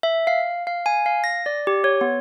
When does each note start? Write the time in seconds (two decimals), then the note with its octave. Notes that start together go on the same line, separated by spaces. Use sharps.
0.03 E5
0.27 F5
0.67 F5
0.86 G#5
1.06 F5
1.24 A#6
1.46 D5
1.67 G4
1.84 C#5
2.01 B3